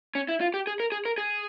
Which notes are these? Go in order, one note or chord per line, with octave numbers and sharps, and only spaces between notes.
C#4
E4
F4
G4
G#4
A#4
G#4
A#4
G#4